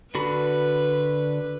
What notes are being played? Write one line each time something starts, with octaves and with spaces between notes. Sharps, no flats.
D3 F#4 B4 B5